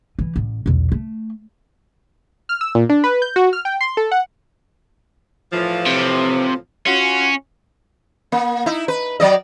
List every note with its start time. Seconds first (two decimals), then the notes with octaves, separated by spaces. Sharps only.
0.19 E3
0.36 A1
0.66 B1 E2
0.92 A3
2.49 F6
2.61 E6
2.75 A#2
2.89 D4
3.04 B4
3.22 G6
3.36 F#4
3.53 F6
3.65 G5
3.81 C6
3.97 A4
4.11 F#5
5.52 A2 E3 F3
5.86 C3
6.86 C#4 F4 F#4
8.32 A#3
8.66 D#4 E4
8.88 B4
9.20 F#3 D5 D#5